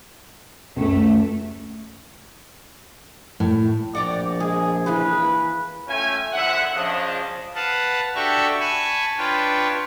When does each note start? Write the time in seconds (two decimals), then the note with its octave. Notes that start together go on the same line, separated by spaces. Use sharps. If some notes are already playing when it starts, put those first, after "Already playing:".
0.76 C#2 F#2 A3
3.40 A2
3.95 A#1 D5 F#5 G5 A#5
4.40 G#3 G#4
4.86 E3 A#3 G#4 B4
5.87 A3 C#4 F4 E5 G5 G#5
6.33 C2 D3 F3 E5 F#5
6.74 C#3 F3 D4 D#5
7.55 B4 F5 F#5 A5
8.15 D4 F#4 G4 A4 E5 C#6
8.60 G#5 A5 B5 C#6
9.17 D4 F4 B4 C#5 G5